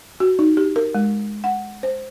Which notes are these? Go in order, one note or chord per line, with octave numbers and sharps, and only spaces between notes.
F#4
D#4
G4
A#4
G#3
F#5
C5